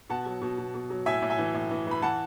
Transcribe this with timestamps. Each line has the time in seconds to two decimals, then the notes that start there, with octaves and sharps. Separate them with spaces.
0.09 B2 F#5 A5
0.26 F#3
0.42 B2
0.58 B2
0.74 B2
0.90 F#3
1.06 A2 E5 G#5
1.22 A2
1.30 E5 G#5
1.38 E3
1.54 A2
1.71 E3
1.87 E3 B5
2.02 E3 F#5 A5